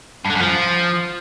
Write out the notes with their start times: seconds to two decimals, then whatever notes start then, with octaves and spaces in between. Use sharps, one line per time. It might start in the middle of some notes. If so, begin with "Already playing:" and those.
0.25 G2
0.30 D3
0.35 F#2
0.41 F3